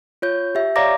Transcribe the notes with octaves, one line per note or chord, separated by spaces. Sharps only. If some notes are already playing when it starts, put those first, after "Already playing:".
F4 C#5 G6
G4 E5
C#5 D5 F5 A#5 D6 A#6